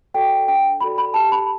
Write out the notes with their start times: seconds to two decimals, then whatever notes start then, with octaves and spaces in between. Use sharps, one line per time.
0.14 F#4 A4 D5 G5
0.48 D4 G5
0.81 F#4 A4 D5 B5
0.98 B5
1.14 G4 A5
1.32 B5